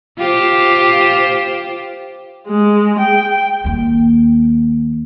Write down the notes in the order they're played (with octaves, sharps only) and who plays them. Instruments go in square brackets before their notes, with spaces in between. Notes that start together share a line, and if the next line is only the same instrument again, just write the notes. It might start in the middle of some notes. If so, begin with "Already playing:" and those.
[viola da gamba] F4 G4 C5
[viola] G#3
G5
[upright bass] D#2 A#3